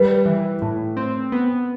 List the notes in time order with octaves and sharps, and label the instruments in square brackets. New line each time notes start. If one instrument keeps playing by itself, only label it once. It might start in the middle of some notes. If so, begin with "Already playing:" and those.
Already playing: [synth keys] G3 [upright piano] B4
[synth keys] E3
A2
C4
B3